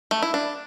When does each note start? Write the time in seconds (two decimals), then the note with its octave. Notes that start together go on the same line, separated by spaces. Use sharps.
0.11 A3
0.22 E4
0.34 D4